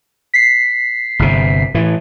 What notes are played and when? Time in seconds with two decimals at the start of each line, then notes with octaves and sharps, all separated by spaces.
0.34 B6 C7
1.19 G1 C3
1.74 A2 E3